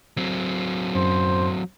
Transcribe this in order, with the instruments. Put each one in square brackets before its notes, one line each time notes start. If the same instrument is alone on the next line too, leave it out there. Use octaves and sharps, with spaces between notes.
[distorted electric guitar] F#3 C4
[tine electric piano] F#2 [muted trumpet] C5